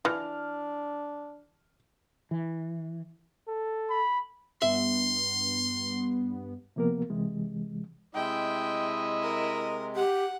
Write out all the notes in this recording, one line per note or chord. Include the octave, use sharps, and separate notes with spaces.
E3 D4 F6
E3
A4
B5
G2 B3 E5 C6
C3 F3 A#3 B3 A#4
C3 E3 G#3
C3 G#3 E4 D#5 G5
A#4
G4 F#5